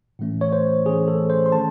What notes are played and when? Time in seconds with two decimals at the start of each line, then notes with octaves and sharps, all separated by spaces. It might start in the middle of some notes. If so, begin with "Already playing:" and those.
0.19 A2 E3 A3 C#4
0.41 C#5
0.53 C5
0.86 A2 E3 A3 C#4 G#4
1.08 A4
1.30 C5
1.46 C6
1.52 D#3 A3 C4 A5